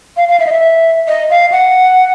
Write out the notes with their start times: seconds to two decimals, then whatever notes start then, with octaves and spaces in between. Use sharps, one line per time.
0.17 F5
0.29 F5
0.40 E5
0.47 D#5
0.52 E5
1.08 D#5
1.30 F5
1.52 F#5